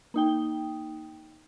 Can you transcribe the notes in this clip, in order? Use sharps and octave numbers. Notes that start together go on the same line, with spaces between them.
A#3 D#4 G5